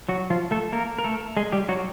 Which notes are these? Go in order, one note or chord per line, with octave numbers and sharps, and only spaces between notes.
F#3 F#4
F3 F4
A3 A4
A#3 A#4
A#4
A3 A4
G#3 G#4
G3 G4
F#3 F#4